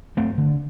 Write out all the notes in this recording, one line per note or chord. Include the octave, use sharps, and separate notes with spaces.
G2 A3 C4
D3